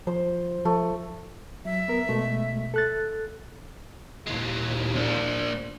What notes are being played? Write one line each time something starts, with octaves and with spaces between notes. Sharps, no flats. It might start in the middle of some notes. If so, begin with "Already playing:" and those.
F3 C5
F3 A3
F#3 E5
B3 A#4
B2 G#3 A3
A4 F#6 A6
D#2 A#2 E3 G#3
A#3 D4